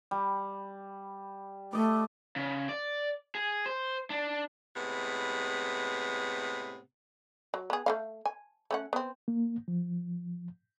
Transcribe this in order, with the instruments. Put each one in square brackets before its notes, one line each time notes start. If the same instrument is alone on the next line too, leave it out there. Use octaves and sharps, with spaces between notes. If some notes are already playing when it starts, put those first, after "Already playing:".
[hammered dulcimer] G3
[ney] A3 [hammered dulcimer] D5 D#5
[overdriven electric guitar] C#3
D5
G#4
C5
D4
[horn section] A2 C3 G#3 B3
[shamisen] F#3
B3 G#4
A3 C#4 F5
G#5
A3 C#4 F#5
B3 C4
[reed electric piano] A#3
F3